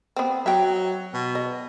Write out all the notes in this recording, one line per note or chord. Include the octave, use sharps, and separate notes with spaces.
B3 C4
F#3 E5 G5
B2
D#5